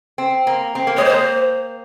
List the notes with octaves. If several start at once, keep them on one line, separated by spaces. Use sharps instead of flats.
C4
A#3
C4
A#3
G#3 C#5
C5
A#3